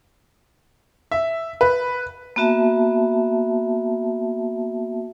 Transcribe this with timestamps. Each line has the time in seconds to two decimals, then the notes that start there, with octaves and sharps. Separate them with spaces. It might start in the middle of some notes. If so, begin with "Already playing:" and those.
1.12 E5
1.61 B4
2.36 A#3 B3 F#4 E5 A5